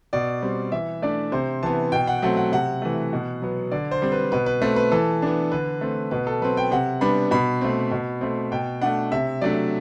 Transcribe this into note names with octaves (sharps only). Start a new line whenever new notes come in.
B2 D5
G3 C4
E3 E5
A3 D4 D5
C3 C5
E3 B3 A5
B2 G5
F#5
F#3 A3 C4 F#5
F#5
C3 F#5
E3 A3
B2
F#3 B3
D3 D5
C5
G3 C4
B4
B2 B4
B4
A3 C4 B4
B4
E3 A4
B3 D4
D3 B4
A3 C4
B2 B4
A4
F#3 C4 B4
G5
C3 F#5
G3 B3 D4 B5
B2 B5
A3 C4
B2
A3 C4
B2 G5
A3 D4 F#5
C3 E5
F#3 A3 D4 D5